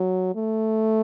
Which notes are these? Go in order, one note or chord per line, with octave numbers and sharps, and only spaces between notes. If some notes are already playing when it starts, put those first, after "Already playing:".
Already playing: F#3
A3